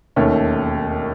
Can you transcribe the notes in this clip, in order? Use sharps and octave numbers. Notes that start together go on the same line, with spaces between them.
E1 D#2 D#3 A3 C#4